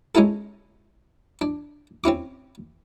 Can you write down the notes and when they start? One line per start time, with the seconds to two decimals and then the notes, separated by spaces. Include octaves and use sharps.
0.15 G#3 C#4 D#4 E4 A4
1.41 D4
2.04 C4 C#4 E4 D6